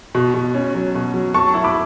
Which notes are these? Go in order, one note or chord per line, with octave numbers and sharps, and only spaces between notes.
B2
B2
C#4
F#3
B2
F#3
F#3 A5 C#6
E4
B5 D6